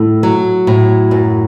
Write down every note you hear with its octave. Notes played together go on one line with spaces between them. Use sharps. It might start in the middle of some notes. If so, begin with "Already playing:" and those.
Already playing: A2 A3
F#3
A2
F#2